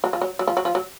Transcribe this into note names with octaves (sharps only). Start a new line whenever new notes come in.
F#3
F3
F#3
F#3
F3
F#3
F3
F#3